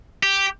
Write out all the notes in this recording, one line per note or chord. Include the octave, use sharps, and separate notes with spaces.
G4